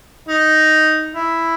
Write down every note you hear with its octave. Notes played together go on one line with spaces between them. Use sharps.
D#4
E4